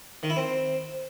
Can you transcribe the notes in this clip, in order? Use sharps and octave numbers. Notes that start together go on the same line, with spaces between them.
D#3
E4
C4